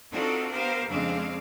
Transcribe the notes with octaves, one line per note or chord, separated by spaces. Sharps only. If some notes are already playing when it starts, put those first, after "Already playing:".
C4 D4 D#4 F4 F#4 A4
B3 G4 A#4 C5 F5
F2 C#3 G#3 C4 D4 F5